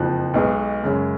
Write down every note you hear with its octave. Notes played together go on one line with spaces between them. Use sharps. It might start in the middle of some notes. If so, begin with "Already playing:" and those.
Already playing: F#1 F2 F3 F#6
B1 B2 G#3
F#2 C#3 G#3 C#4